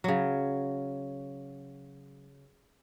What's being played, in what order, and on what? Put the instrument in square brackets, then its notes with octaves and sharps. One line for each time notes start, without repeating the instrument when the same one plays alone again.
[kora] C#3 F#3